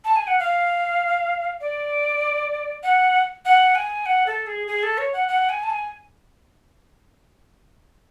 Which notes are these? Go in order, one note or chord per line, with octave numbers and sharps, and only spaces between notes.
A5
G#5
F#5
F5
D5
F#5
F#5
G#5
F#5
A4
G#4
G#4
A4
C#5
F#5
F#5
G#5
A5
G#5